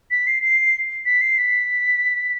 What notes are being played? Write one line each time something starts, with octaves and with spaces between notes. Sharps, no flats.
B6
C7
C7
B6
C7
B6